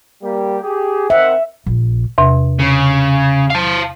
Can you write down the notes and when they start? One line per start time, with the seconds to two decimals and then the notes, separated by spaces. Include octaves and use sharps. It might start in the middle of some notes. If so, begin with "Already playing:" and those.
0.23 G3 A#3 G4
0.63 G4 G#4
1.10 D#3 C4 E5 F#5
1.66 A#1
2.18 E2 C3
2.59 C#3
3.50 F5 A5